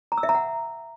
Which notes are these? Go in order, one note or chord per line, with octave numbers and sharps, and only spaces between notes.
A#5
E6
E5
A#5
F#5